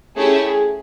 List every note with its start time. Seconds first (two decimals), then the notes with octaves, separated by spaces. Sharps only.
0.16 A3 C#4 E4 G4 G#4
0.46 G#4